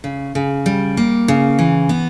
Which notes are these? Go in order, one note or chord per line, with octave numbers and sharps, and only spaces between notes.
C#3
C#3
G3
A#3
C#3
E3
B3